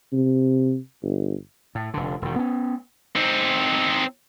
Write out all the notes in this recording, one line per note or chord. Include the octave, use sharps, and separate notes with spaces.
C3
G1
A2
F1 D3
E1 D#3
B3 C#4
C4 D#4